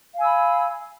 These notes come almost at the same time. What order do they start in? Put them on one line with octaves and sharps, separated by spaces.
F5 G#5 E6 B5